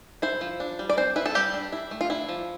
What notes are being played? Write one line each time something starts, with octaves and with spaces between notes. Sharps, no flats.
E4 C5
F3
D4
G3
D5
C4 C5
E4 B4
A4
G3 G4
D4
E4
A3
F4
D4 E4
F3